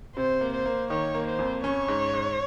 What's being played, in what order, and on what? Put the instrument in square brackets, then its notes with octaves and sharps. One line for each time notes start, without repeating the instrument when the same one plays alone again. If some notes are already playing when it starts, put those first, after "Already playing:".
[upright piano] C3 [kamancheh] C5
[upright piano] A#3
[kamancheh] C5
[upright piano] A#3
[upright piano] D#3 [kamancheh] C#5
[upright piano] A#3
[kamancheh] C5
[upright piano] F2
[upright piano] C#4 [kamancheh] C#5
[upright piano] G#2
G#2